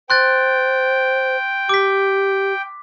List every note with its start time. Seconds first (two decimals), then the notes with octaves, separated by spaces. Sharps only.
0.10 C5 G5 C6 F#6 A6
1.69 G4 D6 B6